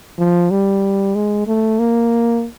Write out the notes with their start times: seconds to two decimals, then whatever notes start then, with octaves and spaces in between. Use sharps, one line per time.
0.19 F3
0.51 G3
1.15 G#3
1.47 A3
1.79 A#3